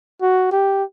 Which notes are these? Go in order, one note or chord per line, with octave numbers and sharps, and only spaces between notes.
F#4
G4